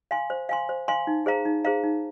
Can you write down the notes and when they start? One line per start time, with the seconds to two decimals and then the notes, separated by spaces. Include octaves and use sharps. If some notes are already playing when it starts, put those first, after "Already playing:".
0.11 F5 G#5 C6
0.30 C5
0.49 F5 G#5 C6
0.69 C5
0.88 F5 G#5 C6
1.07 D#4
1.26 G#4 C5 F5 A#5
1.45 D#4
1.64 G#4 C5 F5 A#5
1.84 D#4